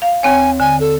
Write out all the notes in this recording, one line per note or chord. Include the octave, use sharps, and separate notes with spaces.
F5
D#2 C4 C#5 G#5
D3 G#5
A4